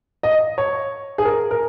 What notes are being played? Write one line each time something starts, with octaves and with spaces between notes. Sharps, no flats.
D#5
C#5
G#4
A#4
A#4